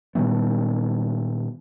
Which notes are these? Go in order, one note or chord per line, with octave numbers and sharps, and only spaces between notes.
A#2 D#3 G3 B3